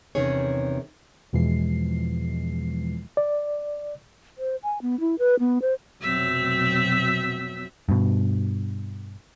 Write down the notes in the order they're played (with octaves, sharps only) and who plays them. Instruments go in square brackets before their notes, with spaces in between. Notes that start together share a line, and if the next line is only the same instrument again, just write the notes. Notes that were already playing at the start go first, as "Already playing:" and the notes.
[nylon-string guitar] E2 C3 D#3 C#4 G#4 C#5
[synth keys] E2 B2 E3 F3 G#3 C7
[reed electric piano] D5
[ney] C5
G#5
B3
E4
B4
B3
C5
[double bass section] F1 B2 F#3 [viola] C4 E5
[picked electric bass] G2 B2